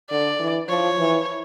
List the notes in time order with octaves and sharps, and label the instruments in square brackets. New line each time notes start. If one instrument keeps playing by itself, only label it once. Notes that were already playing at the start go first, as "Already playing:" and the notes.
[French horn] D3 [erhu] D5
[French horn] E3
[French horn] F3 [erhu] C#5
[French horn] E3